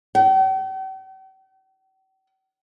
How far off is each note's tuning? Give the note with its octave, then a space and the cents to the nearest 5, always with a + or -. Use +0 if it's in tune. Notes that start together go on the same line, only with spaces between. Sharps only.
G5 -45